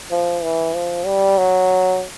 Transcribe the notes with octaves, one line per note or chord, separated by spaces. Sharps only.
F3
E3
F3
G3
F#3